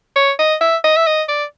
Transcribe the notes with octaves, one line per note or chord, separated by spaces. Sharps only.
C#5
D#5
E5
D#5
E5
D#5
D5